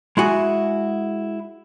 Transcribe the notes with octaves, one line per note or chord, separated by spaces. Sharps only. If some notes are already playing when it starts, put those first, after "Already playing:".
G#3 E4 F#4 G#4